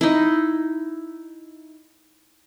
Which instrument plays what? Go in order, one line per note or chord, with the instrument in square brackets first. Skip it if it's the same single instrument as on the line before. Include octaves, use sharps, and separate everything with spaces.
[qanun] D#4 E4